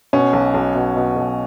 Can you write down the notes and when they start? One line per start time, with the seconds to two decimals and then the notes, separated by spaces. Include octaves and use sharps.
0.13 B2 C#4
0.33 B1
0.54 B1
0.75 B2
0.97 B2
1.17 B1